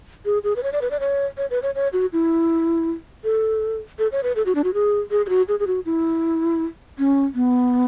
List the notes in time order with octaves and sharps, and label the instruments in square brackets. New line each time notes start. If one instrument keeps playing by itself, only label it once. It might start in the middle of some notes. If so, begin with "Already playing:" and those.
[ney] G#4
G#4
B4
C#5
D5
B4
D5
C#5
C#5
B4
C#5
C#5
F#4
E4
A4
A4
C#5
B4
A4
F#4
D4
F#4
G#4
G#4
G#4
F#4
G#4
G#4
F#4
E4
C#4
B3